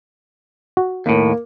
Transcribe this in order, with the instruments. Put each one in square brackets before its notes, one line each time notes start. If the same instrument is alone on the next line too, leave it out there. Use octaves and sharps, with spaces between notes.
[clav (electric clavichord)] F#4
[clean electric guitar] D#2 A2 [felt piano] A#3